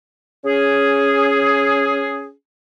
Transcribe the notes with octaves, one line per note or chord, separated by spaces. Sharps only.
C#4 G#4